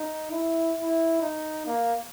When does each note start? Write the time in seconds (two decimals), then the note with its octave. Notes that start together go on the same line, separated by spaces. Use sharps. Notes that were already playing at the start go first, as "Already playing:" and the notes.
Already playing: D#4
0.31 E4
0.77 E4
1.22 D#4
1.66 A#3